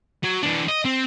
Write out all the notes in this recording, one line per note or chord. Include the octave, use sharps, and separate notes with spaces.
F#3
E3 D4
D#5
C4